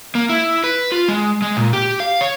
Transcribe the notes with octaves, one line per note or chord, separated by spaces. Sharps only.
A#3
E4
B4
F4
G#3
G#3
A#2
G4
F5
C#5